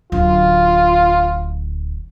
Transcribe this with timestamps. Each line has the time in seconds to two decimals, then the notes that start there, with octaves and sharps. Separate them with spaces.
0.12 D1 F4